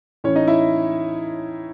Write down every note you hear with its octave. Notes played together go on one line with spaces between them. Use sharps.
A2 E3 C#4 C#5
D#4 D#5
E4 E5